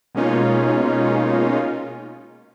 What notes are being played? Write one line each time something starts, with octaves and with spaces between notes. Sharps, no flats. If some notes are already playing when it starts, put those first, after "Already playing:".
B2 G#3 A#3 C#4 D#4 F4